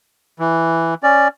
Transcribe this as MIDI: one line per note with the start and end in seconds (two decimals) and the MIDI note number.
0.39 0.94 52
1.03 1.28 61
1.03 1.28 74